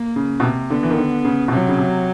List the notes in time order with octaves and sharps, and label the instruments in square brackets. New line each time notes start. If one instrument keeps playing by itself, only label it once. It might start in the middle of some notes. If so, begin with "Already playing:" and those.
Already playing: [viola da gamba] A#3
[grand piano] C#3
B2
C3
[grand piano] D3 [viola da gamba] B3
[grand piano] E3
D#3
D3
C#3
B2
[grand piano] C3 [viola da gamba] F#3
[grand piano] C#3
C3